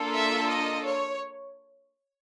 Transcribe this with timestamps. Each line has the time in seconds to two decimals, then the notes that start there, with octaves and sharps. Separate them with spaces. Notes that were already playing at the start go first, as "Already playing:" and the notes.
Already playing: A#3 D4 F4 A4
0.14 E5
0.49 D#5
0.85 C#5